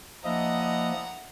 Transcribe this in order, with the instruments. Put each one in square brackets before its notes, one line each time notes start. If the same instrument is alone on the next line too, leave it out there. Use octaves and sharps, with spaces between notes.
[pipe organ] F3 A#3 [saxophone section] D4 E4 D#5 [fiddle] F#5 A#5